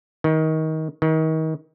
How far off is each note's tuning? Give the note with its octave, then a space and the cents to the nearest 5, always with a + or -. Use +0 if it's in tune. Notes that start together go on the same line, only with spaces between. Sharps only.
D#3 +20
D#3 +30